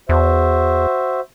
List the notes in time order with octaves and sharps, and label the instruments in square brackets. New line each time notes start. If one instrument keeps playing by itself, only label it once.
[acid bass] E2 [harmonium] F#4 C5 E5